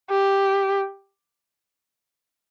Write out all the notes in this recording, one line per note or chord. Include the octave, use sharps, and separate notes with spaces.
G4